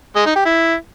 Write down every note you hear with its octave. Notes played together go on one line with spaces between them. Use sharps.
G#3
D#4
G4
E4